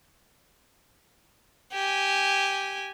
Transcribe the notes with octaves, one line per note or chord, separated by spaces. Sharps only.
G4 G#5